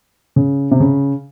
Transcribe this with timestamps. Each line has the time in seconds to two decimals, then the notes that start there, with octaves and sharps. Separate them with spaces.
0.36 C#3
0.71 C3
0.80 C#3